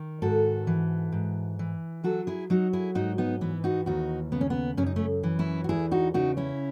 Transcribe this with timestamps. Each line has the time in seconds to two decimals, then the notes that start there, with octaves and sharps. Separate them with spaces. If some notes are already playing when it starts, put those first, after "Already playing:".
Already playing: D#3
0.22 G#2 F#4 A4
0.67 E3
1.12 G#2
1.59 E3
2.04 F#3 F#4 A4
2.27 E4 G#4
2.50 F#3 D#4 F#4
2.73 E4 G#4
2.95 G#2 D#4 F#4
3.18 B3 D#4
3.41 E3 B3
3.64 D#4 F#4
3.86 D#2 D#4 F#4
4.32 C#3 B3
4.41 C#4
4.50 B3
4.77 F#2 C#4
4.86 D#4
4.96 A3 C#4
5.23 E3
5.39 C#4 E4
5.64 F#4
5.69 E2 E4 G#4
5.91 D#4 F#4
6.14 C#3 D#4 F#4
6.37 C#4 E4